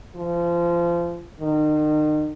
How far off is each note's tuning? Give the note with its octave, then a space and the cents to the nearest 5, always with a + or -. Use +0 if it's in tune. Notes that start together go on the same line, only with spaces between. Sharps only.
F3 -25
D#3 -35